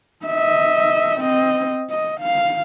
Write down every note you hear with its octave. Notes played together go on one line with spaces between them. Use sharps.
D#5 E5
C4 D#5
D#5
F5